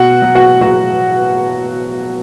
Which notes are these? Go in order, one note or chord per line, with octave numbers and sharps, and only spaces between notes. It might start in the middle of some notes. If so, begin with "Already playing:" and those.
Already playing: B2 F#4 F#5
F#3
F#4 F#5
F#3 F#4 F#5